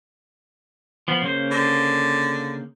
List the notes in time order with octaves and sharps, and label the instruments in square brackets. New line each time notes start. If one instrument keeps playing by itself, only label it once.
[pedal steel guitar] F3 B3 F4
C#3 A#3 C5
[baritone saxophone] D3